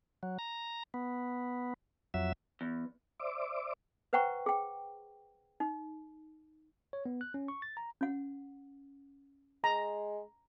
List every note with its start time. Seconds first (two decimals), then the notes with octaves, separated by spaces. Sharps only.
0.23 F#3
0.39 A#5
0.94 B3
2.14 F2 F#3 E5
2.61 E2
3.20 C5 D5 E5 D6
4.13 B4 C5 F#5 G5 A#5 C#6
4.46 G#4 G5
5.60 D#4
6.93 C#5
7.06 B3
7.21 F#6
7.34 C#4
7.48 C#6
7.62 A6
7.77 A#5
8.01 C#4 F#5
9.64 G#3 A#5